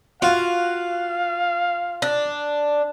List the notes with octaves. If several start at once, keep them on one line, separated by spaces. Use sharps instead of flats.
F4 F#4 F5
D4